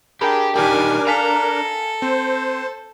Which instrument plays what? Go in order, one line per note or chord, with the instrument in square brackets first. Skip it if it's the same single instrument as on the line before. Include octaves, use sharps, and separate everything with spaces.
[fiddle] D4 [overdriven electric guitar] G4 G5 [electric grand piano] G#4 A#4 B5
[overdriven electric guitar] D#3 G3 [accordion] D4 A#4 [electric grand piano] G4 [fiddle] G#5 D6
[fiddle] A4 [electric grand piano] F5 G#5 B6 [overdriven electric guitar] A#5
[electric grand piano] C4 [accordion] C5